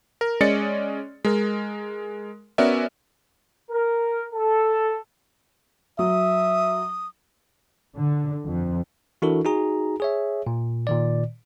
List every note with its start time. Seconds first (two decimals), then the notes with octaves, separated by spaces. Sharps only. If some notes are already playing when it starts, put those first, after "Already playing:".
0.21 A#4
0.41 G#3 C#4 D5 D#5 A6 C#7
1.25 G#3 A#4
2.58 B3 C#4 F#4 A#4 D5 E5
3.71 A#4
4.34 A4
5.99 F#3 E5 D#6
7.96 D3
8.44 F2
9.22 E3 D4 E4 F#4 A4 A#4
9.45 D#4 F#4 G#4 A#5
10.00 G#4 C#5 E5
10.47 A#2
10.87 A#2 D#3 D5